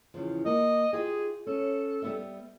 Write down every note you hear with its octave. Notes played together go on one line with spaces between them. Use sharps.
E2 C#3 F3
A#3 D#5 F#5
D#4 F4 G4 G#4
C#4 A4
G3 B3 E5